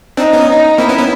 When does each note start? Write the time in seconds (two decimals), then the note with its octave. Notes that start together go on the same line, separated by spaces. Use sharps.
0.17 C4 D4 D#4
0.33 B3 C#4
0.48 D#4
0.78 A#3 C4 E4
0.89 B3 C#4
0.99 B3 C#4